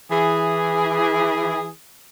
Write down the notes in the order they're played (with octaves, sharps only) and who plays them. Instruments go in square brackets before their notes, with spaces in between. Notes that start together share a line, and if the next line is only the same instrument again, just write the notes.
[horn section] E3 G#4